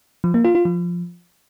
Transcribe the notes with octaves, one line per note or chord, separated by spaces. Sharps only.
F3
A#3
F4
F4
F3